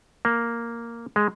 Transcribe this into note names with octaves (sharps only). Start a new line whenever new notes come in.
A#3
G#3